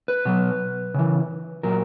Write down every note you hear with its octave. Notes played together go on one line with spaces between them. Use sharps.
B4
B2 F#3
C#3 E3
A#2 F#3 A#4